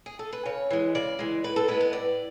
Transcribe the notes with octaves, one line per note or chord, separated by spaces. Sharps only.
G#4
A4
B4
C#3 C#5
E3 G#3
C#3 D5
E3 G#3
A2 B4
A4
G#3 B3 B4
B4
A2 D5